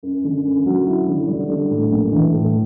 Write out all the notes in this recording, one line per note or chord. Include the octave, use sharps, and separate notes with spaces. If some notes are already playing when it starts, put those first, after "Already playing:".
F#2
D3
F#2
F#3
E4
D3
G3
D3
A2
A#1
E3
A2